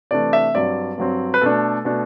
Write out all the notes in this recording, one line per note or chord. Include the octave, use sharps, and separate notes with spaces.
C3 E3 A3 D4 D5
E5
G2 F#3 C4 D5
G2 F#3 C4
B4
B2 A3 D4 A4
B2 A3 D4